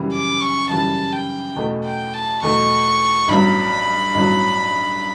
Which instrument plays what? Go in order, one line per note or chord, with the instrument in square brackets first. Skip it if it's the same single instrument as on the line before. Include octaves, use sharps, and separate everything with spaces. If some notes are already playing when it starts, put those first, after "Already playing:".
Already playing: [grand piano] F#2 C#3 E3 G3
[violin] D6
C#6
[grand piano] F#2 C#3 E3 G3 [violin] A5
[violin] G5
[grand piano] E2 B2 A3
[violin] G5
A5
[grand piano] E2 B2 A3 [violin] C#6
[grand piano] A1 G2 F#3 B3 [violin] B5
[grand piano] A1 G2 F#3 B3